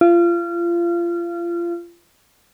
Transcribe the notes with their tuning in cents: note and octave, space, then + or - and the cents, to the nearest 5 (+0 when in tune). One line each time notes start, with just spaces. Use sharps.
F4 -30